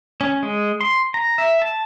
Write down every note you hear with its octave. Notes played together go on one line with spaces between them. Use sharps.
C#4
G#3
C6
A#5
E5
A5